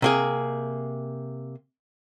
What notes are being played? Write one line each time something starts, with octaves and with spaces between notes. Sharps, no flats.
C3 A#3 G#4